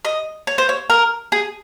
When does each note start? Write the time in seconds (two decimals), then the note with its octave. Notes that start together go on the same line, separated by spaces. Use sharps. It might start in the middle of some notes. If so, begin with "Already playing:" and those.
0.05 D#5
0.47 C#5
0.58 C5
0.69 C#5
0.90 A#4
1.32 G#4